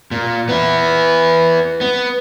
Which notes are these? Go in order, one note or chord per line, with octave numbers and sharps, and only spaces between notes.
A#2
B3 E4
B3